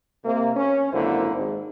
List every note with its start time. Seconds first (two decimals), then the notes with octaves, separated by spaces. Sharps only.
0.24 C3 A#3
0.55 C#4
0.93 G#1 F#2 D3 A#3 E4 C5
1.35 G#1